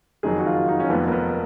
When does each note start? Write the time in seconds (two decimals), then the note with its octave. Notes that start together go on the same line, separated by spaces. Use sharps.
0.23 F#1 F2 D#3 F#3 G#4
0.39 F#4
0.46 F4
0.68 D#4
0.80 C#4
0.90 F1 F2 F3 B3
1.07 A#3
1.12 B3